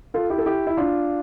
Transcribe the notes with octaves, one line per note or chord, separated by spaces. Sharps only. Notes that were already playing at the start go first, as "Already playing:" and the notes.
F4 A4
E4 G4
A4
E4 G4
E4
D4 F4